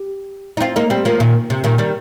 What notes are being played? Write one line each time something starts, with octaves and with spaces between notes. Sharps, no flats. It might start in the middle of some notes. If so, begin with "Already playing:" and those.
Already playing: G4
D#4
C4 F4
A#3 D#4
G3 C4
F3 A#3
A#2 D#3
C3
A#2 D#3
D#3 G3